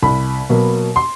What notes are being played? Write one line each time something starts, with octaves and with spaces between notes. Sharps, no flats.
C2 B5
B2 F#3 A#3
C6